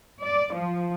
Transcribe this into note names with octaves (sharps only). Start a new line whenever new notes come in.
D5
F3